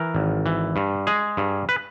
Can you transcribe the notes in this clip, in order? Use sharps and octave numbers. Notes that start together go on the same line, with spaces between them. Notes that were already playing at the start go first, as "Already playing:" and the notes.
Already playing: E3 A#4
G#1
E3
G2
G#3 G#4
G2
B4